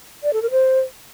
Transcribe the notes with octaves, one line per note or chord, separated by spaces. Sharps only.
D5
A4
A#4
C5